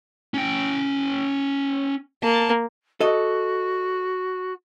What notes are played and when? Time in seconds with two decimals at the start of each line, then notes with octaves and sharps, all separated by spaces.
0.34 C#4 G5
2.23 A#3 A5
3.00 F#4 A4 D#5